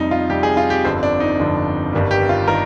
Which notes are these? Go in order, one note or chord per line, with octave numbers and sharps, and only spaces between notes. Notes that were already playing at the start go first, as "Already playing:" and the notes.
Already playing: F2 C3 G3 D#4
F4
F2 C3 G3 G4
G#4
F4
G4
G1 F2 D3 F3 C4
D4
D#4
G1 F2 D3 F3
G1 G2 D#3 G3
G4
F4
D#3 G3 A#4